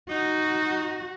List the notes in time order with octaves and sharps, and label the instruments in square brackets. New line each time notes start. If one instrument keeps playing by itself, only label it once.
[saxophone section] D#4 [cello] F#4